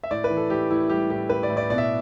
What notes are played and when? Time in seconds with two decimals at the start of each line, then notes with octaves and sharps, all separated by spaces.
0.03 E5
0.11 A2 D5
0.24 B4
0.30 E3
0.37 A4
0.50 A2 G4
0.70 A2 E4
0.90 G3 G4
1.10 A2 G4
1.29 A2 B4
1.43 D5
1.50 A2
1.57 D5
1.70 B2 D5
1.78 E5